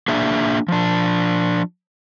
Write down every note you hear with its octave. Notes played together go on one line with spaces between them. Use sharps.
A#3 D4 G#4 D5 E5
F3 D4